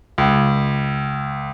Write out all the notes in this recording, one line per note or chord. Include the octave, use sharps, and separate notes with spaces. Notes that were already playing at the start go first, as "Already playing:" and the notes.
C#2